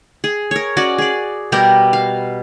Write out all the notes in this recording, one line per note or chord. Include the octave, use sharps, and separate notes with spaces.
G#4
A#4 C#5
C#4 F#4 D5 D#5
G#4 D5
B2 G3 G4 A#4
F5